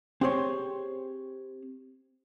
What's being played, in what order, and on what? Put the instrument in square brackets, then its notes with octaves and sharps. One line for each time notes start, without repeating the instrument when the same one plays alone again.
[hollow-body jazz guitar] C4 G4 G#4 C5 C#5